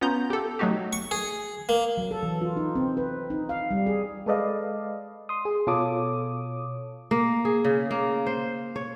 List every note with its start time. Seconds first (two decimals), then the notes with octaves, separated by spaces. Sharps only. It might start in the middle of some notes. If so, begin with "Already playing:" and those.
0.01 B3 C#4 F4 A#5 G6
0.30 G4 A4
0.59 F#3 A3 D#4 F#4 G4
0.93 C#6
1.11 G#4
1.69 A#3
1.98 F#3
2.11 A4
2.23 E3
2.42 F4
2.56 D#4
2.75 C4
2.97 B4
3.30 D#4
3.49 F5
3.71 G3
3.86 G#4
4.26 G#3 A4 B4 D5 D#5 F5
5.29 C6 D#6
5.45 G#4
5.67 B2 F4 A4 C#5 D6 D#6
7.11 A#3
7.45 G#4
7.65 C#3
7.91 A#3
8.26 C5
8.76 C#5